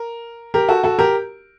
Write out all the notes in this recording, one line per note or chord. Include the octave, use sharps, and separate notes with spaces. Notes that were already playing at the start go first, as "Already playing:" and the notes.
Already playing: A#4
G4 A#4
F#4 A4
F#4 A4
G4 A#4